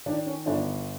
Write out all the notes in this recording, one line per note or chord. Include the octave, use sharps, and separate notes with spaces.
D#3 D4
C#4
G1 D4